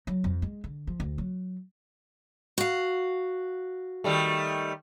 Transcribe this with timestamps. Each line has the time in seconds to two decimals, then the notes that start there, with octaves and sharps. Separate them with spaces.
0.07 F#3
0.24 F2
0.42 G#3
0.64 D3
0.87 F3
1.00 D2
1.18 F#3
2.58 F#4 F5
4.04 D#3 G3 A3